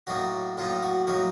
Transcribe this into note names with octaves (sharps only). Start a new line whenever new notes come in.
A2 F#3 A#3 D#4 F#4
A2 F#3 A#3 D#4 F4
F#4
A2 F#3 A#3 D#4 F#4